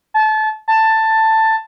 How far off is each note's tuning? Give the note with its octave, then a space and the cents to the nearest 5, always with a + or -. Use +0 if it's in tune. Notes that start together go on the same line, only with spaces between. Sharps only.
A5 -25
A5 +10